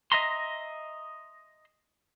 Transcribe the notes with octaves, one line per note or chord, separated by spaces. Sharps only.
D#5 E5 A#5 C6